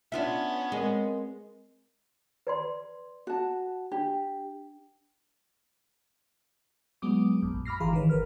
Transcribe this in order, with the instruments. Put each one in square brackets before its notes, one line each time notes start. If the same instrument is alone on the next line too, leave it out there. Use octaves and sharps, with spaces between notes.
[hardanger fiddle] B3 C#4 [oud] D4 F4 E5
[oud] G#3 [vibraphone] C4 A#4
[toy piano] B4 D5 C6
[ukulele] F#4 A5
[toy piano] D4 [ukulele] G4
[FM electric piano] F#3 G#3 B3 D6 D#6
A#1 F#2
B5 D6 F6 A#6 C7
G#1 E3 G#4 F5 A#5 C6
D#3 E3 B4 C#5
G1 A#4 B4 F6